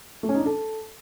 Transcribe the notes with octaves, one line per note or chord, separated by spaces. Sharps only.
A3
C#4
D#4
D4
A4